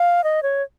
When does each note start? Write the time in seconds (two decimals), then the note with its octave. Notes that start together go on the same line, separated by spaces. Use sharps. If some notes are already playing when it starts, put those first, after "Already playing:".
Already playing: F5
0.24 D#5
0.43 C#5